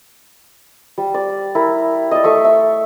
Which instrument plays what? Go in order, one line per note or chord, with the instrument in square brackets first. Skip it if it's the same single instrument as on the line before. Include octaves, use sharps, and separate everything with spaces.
[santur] G3
D5
E4 A#4
D5 D#5
A3 E5 C#6
E5